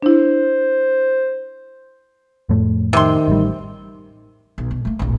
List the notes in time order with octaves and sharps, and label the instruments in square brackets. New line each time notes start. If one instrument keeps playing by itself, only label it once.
[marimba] D4 E4 [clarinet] C5
[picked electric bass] F2 A2 A3
[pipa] C3 C6 [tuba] D#3
[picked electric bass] A1 G3
[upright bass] B1
B2
A3 A#3
D1 A#1